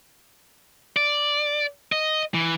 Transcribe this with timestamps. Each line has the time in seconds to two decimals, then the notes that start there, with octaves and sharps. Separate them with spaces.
0.96 D5
1.92 D#5
2.34 E3